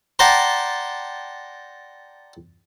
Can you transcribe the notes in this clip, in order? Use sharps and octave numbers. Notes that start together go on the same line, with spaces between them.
D5 F#5 G5 A5 A#5 C6